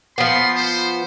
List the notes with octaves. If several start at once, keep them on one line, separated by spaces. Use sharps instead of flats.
F3 B3 C6
C5